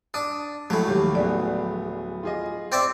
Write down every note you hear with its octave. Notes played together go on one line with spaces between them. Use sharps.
D4 D#6
A2 F3 F#3 G#3 A3
D#2 G4
D1 B3 G#4 D5
F4 G#4 D#5
C4 D5 E5